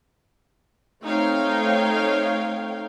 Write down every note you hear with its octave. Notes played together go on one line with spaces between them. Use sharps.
A3 C4 D#4 C#5 F5 G5